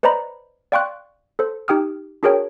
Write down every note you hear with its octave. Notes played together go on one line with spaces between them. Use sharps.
B4 C5 D5 D#5 A#5 B5
D5 F5 G5 C6 C#6 F#6
A4 C5
D#4 G4 G5 D#6 F6
D4 F#4 G#4 A#4 C#5 G5